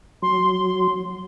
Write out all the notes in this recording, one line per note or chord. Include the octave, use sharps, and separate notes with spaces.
F#3 C6